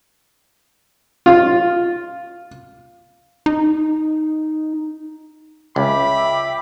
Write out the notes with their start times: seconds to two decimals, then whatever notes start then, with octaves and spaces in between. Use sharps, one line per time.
1.26 F4
3.46 D#4
5.76 C#2 E5 G5 B5 D6